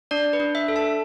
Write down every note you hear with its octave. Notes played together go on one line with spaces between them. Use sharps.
D4 D5
B4
D4
E5
A4
A5